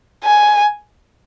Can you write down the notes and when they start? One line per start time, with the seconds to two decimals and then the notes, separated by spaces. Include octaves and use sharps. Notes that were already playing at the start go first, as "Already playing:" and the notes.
0.24 G#5